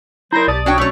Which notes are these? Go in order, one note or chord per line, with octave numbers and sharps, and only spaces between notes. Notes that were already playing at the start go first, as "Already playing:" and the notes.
F#3 E4 A#4 C5 A#5 A#6
B1 G4 D5 A5 D#6
C#4 D4 F#4 C#5 G5
B2 F#3 A3 C#5 D5